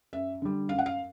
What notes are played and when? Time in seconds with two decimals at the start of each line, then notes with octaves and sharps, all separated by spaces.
0.13 F#2 E5
0.42 D3 G3
0.69 F#2 F5
0.79 F#5
0.86 F5